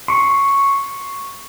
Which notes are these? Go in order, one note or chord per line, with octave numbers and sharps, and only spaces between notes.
C6 C#6